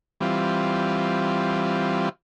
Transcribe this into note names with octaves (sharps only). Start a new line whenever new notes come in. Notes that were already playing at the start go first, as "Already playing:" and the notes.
E3 G3 C4 F4